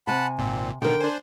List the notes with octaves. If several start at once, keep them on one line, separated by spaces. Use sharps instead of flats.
C3 F#5 G#5 A5 B5
G#1 A#2 C4
B2 D3 D#3 A#4 G5
D4 C5 G#5